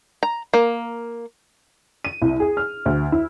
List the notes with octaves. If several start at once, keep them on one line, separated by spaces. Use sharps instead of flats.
A#5
A#3
D#7
C2
G#4
F6
D2
E4